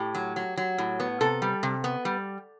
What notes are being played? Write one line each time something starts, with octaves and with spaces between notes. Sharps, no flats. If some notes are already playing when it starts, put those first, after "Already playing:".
Already playing: A2 G4
F#3
F#3
F#3
A2
B3
C3 A4
G3
C3
B3
G3